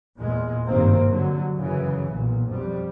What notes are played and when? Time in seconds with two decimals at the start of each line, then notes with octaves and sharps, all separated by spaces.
0.18 E2 A#2 G#3
0.67 G#1 G2 C3 D#3 A#3 C4
1.10 D3 F#3
1.57 F#2 C#3 E3
2.12 B1 A#2
2.51 F2 G3